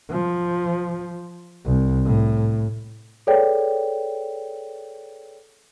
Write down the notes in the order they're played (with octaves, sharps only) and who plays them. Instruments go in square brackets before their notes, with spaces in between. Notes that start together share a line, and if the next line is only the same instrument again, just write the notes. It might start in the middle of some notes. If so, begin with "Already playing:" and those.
[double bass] F3
C2
A2
[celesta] G#4 A4 B4 C#5 D5 G5